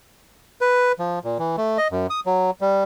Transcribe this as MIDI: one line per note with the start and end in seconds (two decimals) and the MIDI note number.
0.61 0.92 71
0.99 1.19 53
1.24 1.38 46
1.39 1.56 52
1.57 1.78 57
1.78 1.88 75
1.92 2.07 42
2.10 2.20 87
2.26 2.51 54
2.61 2.84 55